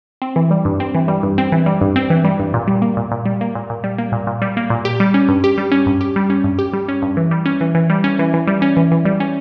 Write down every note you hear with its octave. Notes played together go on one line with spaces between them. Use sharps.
C4
E3
G3
G2
C4
E3
G3
G2
C4
E3
G3
G2
C4
E3
G3
G2
A#2
G3
A#3
A#2
A#2
G3
A#3
A#2
A#2
G3
A#3
A#2
A#2
G3
A#3
A#2
G4
G3
C#4
G2
G4
G3
C#4
G2
G4
G3
C#4
G2
G4
G3
C#4
G2
E3
G3
C#4
E3
E3
G3
C#4
E3
E3
G3
C#4
E3
E3
G3
C#4